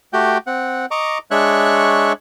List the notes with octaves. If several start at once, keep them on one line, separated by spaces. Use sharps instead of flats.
A3 F#4 G4 G5
C4 F#5
D#5 A#5 C#6 D6
G#3 D4 C#5 E5 C#6 F#6